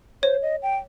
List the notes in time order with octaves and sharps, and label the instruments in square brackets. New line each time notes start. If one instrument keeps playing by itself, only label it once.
[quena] C5 [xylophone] C#5
[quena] D#5
G5